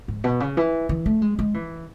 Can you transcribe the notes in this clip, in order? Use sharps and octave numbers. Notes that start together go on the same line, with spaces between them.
G#2
B2
C#3
E3
E3
A3
G#3
G#3
E3